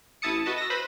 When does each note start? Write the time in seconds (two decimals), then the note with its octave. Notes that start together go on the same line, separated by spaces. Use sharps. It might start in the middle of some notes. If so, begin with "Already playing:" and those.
0.22 A1 E4 A5 D#6 C#7
0.46 F#4 B4 D#5 A5
0.58 E6 A#6
0.70 B4 C5 B5